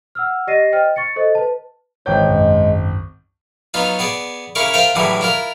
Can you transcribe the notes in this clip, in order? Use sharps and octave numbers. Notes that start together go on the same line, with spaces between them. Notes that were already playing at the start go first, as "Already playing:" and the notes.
F#5 E6 F6
G4 D5 D#5 A#6 C7 D#7
C5 D#5 G5 F6
C#6 A6 C#7
A4 C5 D#5
B4 A5
G#1 E3 G#3 C#5 G5 G6
B1 F#2
F#3 B3 D#4 F4
B3 G#4 D5
C#3 E4 A#4 F5 C#6 D6
F4 A#4 C5 E5 F5 G5
A2 D3 E3 F#3 G3 G#4
E4 F4 A#4